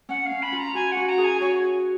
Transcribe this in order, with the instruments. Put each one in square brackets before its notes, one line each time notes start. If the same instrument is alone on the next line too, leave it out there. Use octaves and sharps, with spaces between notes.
[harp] C#4 [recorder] F#5
[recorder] F5
[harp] C#4
[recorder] B5
[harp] F4
[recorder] A#5
[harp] F#4 [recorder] G#5
[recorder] F#5
[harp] F#4
[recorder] A#5
[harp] G#4
[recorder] G#5
[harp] F#4 [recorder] C#5